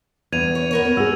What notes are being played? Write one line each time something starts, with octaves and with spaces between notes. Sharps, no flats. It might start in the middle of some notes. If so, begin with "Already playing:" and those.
E2 G2 G#6 D#7 F7
C#5
B3 A#4 C#5
A#4
F#4 G#4 E6